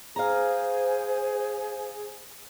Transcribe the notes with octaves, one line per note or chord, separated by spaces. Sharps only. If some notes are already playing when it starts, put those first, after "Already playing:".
G#4 C5 F5 A#5